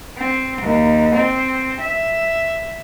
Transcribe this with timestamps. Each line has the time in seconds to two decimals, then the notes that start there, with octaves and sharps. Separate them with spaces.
0.16 C4
0.61 D#2
1.14 C4
1.80 E5